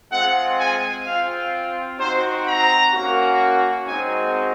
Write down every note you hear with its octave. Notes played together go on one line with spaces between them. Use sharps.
G#3 C4 F4 F#5
G#5
C4 F4 F5
C4 D#4 F#4 C5
A#5
A#3 C#4 F#4
G#3 C4 D#4 F#4 G#5